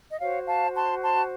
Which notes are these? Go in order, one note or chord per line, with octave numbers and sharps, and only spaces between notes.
D#5
F#4 C5 C#5 F5
F5 A5
A5 C6
A5 C6